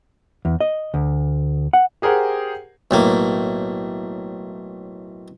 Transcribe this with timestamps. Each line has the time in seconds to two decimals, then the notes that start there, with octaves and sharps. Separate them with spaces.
0.45 E2
0.61 D#5
0.94 D2
1.73 F#5
2.02 G4 G#4 A#4 C5 F#5
2.91 B1 A2 A#3